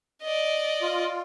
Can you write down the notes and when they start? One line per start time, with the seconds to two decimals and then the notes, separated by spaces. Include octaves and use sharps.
0.22 D5 D#5
0.82 F4